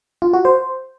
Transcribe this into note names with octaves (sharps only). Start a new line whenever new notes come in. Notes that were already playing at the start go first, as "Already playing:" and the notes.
F4
F#4
C5